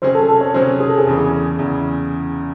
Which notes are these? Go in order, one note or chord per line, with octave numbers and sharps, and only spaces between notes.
C3 F#3 C#4 G#4 C5
A4
A4
C#5
C3 F#3 C#4 G#4 C5
G#4
A4
G#4
E2 C#3 E3
E2 C#3 E3